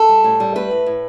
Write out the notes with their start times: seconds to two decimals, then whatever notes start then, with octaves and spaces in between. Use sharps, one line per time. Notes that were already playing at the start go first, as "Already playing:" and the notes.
Already playing: A4
0.09 G3
0.24 A2
0.40 G3
0.55 A3 B4
0.71 A2
0.86 A2